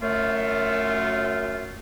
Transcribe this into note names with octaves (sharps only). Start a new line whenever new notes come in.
F#2 A3 F4